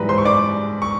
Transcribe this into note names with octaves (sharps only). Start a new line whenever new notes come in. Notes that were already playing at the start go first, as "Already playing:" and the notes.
Already playing: G#2 E3 G3 B4 A#5 B5
C5 C6
C#6
D5 D6
C#6